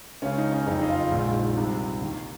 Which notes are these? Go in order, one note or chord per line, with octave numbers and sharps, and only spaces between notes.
C#2 C#3 C#4
D#4
C#4
F#1 F2 C#3 D#4
D#4
F4
A#1 G#2 D#3
C2 C3 D#3
D#2 D#3